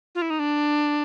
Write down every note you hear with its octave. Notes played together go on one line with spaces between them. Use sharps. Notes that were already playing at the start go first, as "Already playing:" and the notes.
F4
E4
D#4
D4